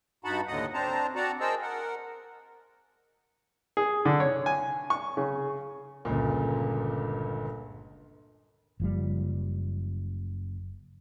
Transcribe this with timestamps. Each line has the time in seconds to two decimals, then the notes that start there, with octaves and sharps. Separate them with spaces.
0.24 G2 D#4 F#4 F#5 A5 B5
0.48 D#2 A2 D3 D#5 F#5 D#6
0.74 C4 D4 C5 A5 A#5
1.15 C4 F#4 D5 F#5 A5 A#5
1.40 G#4 A#4 C5 D#5 A5 E6
1.62 A#4 F#5
3.77 G#4
4.05 D3
4.20 C#5
4.46 G#5
4.90 C#6
5.17 C#3
6.05 G1 C#2 A#2
8.80 F#1 F3 G3